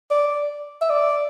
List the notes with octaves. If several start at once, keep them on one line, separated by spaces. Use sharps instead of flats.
D5
E5
D5